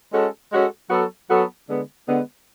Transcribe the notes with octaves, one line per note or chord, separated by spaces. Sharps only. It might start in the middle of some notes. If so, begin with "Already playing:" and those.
G#3 C#4 F#4 A4
G#3 C#4 F#4 A4
F#3 B3 F#4 A4
F#3 B3 F#4 A4
D3 G#3 B3
D3 G#3 B3